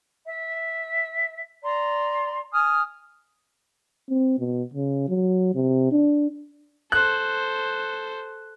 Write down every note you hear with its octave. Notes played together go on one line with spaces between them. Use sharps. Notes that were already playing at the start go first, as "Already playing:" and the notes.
E5
D5 A#5 C6
G#5 D#6 F6
C4
B2
C#3
F#3
C3
D4
A4 C5 F#6